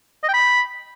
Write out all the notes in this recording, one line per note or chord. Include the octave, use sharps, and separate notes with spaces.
D#5
G5
B5